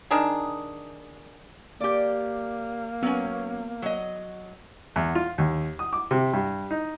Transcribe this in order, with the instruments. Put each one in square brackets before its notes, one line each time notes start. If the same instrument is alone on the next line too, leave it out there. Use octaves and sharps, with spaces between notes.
[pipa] D#3 D4 G#4
[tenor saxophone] A#3 [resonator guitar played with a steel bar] G4 D5
[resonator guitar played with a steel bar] F#3 C#4 [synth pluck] B3
[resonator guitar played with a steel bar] F#3 D#5
[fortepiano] E2
F4
D#2
D#6
D6
C3
G2
D#4